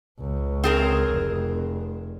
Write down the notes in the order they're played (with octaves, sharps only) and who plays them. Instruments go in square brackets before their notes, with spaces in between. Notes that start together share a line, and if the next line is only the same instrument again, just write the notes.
[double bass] C#2
[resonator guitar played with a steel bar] C4 G#4 A#4
[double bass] F1